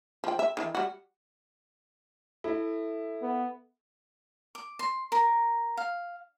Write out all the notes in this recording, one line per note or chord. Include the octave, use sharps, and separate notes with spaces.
F3 G5
E5
D#3 E3
G3 F#4
E4 A4 E5
B3
D6
C6
A#4
F5